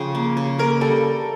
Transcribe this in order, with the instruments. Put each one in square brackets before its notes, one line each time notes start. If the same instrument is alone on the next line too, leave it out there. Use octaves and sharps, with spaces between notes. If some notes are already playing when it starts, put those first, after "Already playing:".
Already playing: [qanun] C#3 F3 [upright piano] G5
[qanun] A#3
C#3
[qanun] A#3 [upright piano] A#4
[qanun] G3 [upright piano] A4